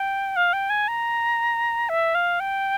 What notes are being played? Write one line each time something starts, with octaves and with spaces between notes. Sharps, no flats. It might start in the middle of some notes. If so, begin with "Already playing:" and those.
Already playing: G5
F5
G5
G#5
A#5
E5
F5
G5